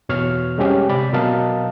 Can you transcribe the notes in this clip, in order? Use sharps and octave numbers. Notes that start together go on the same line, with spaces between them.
E2 B2 C#5 F6
G3 G#3 C4 C#4 G4
C3 D5 B5
B2 F#3 A#4 D#5 F5 A5